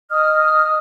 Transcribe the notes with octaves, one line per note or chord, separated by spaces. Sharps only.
D#5 D#6 F6